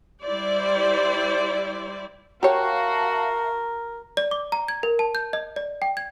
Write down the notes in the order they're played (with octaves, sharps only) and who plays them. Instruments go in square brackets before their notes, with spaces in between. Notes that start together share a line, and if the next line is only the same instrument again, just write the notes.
[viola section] G3 E4 C5 D5
[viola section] F#4 [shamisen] G4 C#5 [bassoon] A#4 [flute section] E5 F5 A5
[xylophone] D5
D6
A#5
G#6
A#4
A5
G6
D#5
D5
G5
G#6